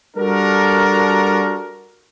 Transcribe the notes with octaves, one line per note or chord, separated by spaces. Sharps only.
G3 D4 F#4 A4 A#4